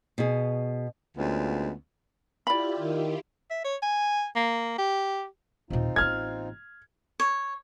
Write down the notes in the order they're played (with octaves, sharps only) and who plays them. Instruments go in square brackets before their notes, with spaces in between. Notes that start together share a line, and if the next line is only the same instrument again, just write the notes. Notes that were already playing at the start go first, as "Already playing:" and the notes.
[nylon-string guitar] B2 G#4
[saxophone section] D2 G#3 B3 C#4 F4
[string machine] E4 F4 G4 [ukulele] D5 B5
[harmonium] D#3
[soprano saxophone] E5
C#5
G#5
A#3
G4
[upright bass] D#2 A#2 [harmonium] C4 D#4 F4
[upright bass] A1 A#3 [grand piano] F6 G#6
[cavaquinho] C#5